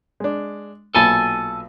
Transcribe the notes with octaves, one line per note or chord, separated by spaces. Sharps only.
G#3 D4
B1 A#2 A4 G#5 A5 B5